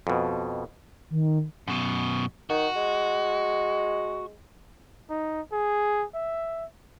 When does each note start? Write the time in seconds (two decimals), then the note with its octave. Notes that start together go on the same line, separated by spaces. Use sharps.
0.07 F2 B2
1.10 D#3
1.68 F#2 B2
2.50 D#3 F#4
2.76 G#3
5.10 D#4
5.52 G#4
6.14 E5